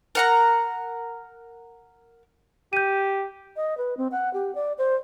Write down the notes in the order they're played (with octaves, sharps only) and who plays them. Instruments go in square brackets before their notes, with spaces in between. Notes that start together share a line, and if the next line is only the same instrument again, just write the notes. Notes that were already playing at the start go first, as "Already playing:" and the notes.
[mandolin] A#4 F#5 A#5
[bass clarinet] G4 [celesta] G6 D#7
[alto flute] D#5
B4
C4
F#5
G4
D5
C5